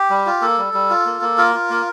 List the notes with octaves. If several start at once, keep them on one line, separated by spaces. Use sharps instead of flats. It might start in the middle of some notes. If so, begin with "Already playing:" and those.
Already playing: G4
G3
F4
A#3 A4
G3
G3
F4
A#3
A#3
F4 A#4
F4
A#3